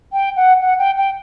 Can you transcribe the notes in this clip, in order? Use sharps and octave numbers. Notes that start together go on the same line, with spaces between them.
G5
F#5
F#5
G5
G5